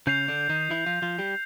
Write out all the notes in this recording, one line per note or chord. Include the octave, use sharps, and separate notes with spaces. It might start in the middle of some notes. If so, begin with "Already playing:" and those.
C#3 C#4 G6 C7 F7
D3 D4
D#3 D#4
E3 E4
F3 F4
F3 F4
G3 G4